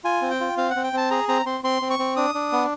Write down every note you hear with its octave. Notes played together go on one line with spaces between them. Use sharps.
F4 G#5
C4
G5
F4
C4 F5
F#5
C4
G5
C4 A5
G#4 A#5
C4 A#5
C4 C6
C4 C6
C4
C#6
C4
D4 D#6
D4
B3